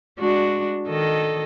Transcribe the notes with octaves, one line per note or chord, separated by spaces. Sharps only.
G#3 D4 F#4
D#3 A4 D#5